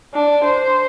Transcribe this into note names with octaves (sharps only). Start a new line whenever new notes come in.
D4
C5